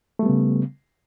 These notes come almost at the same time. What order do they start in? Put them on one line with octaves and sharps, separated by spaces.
A3 G3 B3 C#3